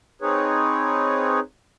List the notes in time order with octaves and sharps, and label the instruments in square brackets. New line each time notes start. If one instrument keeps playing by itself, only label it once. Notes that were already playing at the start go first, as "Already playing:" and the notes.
[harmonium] C4 D#4 G#4 B4 C#5